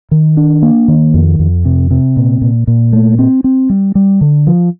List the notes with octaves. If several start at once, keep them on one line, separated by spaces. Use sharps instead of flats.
D#3
D4
A#3
D#3
F2
F2
C3
C3
A#2
A#2
A#2
A3
C4
C4
G3
G3
D3
F3